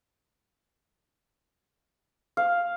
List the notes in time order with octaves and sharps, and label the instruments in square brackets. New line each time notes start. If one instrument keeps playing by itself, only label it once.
[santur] F5